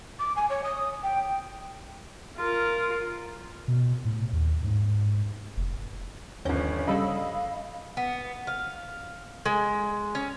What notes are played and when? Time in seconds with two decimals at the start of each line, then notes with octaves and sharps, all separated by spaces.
0.19 D6
0.36 G#5
0.50 C#5
0.64 D#6
1.03 G5
2.37 F4 A#4
3.68 B2
4.05 A2
4.33 D#2
4.64 G#2
5.57 F1
6.45 G1 D#2 F3 C#4 G6 A#6
6.87 C#3 G3 A4 D#5 F5 B5 E6
7.97 B3
8.47 F5
9.46 G#3
10.15 C#4